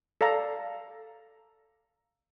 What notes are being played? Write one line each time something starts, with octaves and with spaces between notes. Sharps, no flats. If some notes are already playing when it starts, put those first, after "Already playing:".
A4 D5 F5 A#5